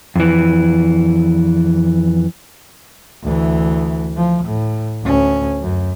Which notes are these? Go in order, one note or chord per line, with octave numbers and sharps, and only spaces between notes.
F2 E3
D2 E3
F3
A2
D2 C#4
F#2